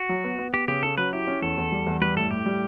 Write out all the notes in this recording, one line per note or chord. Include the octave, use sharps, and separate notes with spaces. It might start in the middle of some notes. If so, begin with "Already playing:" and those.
Already playing: F#4
F#3
B3
B3
B3 G4
C#3 G4
C#4 A4
F#3 B4
E4 G4
C#4
E2 A4
E2
G3
E2
G3 B4
A2 A4
A2 G4
G3